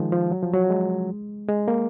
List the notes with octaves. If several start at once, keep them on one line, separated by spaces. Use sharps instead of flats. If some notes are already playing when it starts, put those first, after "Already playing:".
Already playing: D#3 F3 G#3
F3
F#3
F3
F#3
G#3
G#3
A#3